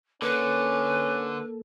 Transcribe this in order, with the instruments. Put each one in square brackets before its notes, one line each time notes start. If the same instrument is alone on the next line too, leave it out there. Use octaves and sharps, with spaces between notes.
[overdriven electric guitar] D3 [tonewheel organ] A#3 A4 [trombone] C#4 [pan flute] B4